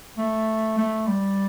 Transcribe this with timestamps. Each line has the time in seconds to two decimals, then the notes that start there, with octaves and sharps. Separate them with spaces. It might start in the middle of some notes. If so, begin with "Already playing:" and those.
0.18 A3
0.78 A3
1.08 G3